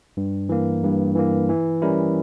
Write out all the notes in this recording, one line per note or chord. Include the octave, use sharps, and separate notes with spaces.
G2
E3 A#3
G2
E3 A#3
E3
G3 C#4 E4 A#4